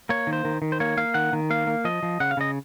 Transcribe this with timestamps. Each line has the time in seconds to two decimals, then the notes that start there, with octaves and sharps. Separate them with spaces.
0.09 A#3 C#5
0.27 D#3
0.33 C5
0.45 D#3
0.62 D#3
0.72 C5
0.80 A#3 C#5
0.97 A#3 F5
1.14 D#3 F#5
1.33 D#3
1.50 A#3 F5
1.67 A#3
1.85 F3 D#5
2.03 F3
2.20 C#3 F#5
2.31 F5
2.37 C#3 D#5